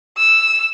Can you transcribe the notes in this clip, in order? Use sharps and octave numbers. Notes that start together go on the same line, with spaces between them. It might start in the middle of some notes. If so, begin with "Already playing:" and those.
E6